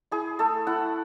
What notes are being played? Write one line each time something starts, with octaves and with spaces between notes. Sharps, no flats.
E4 G#4
A3 A4
E4 F#5